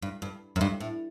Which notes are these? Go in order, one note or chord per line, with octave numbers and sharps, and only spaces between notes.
G2
G2
F#2
G2
A2